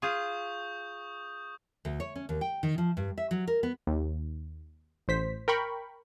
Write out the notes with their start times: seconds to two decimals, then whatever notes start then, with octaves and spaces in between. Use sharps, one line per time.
0.02 F4 G#4 C#6 D#6 G6
1.85 D2
2.00 C#5
2.16 C#4
2.29 D#2
2.41 G5
2.63 D#3
2.78 F3
2.97 G2
3.18 E5
3.31 F#3
3.47 A#4
3.63 B3
3.87 D#2
5.08 A1 C5 B6
5.48 A#4 G5 B5 C#6